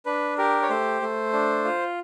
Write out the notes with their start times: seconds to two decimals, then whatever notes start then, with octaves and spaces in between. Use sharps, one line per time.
0.06 D4 B4
0.38 G4 A#4
0.62 C#5
0.70 A3 C5
1.02 A3
1.33 D4
1.64 F4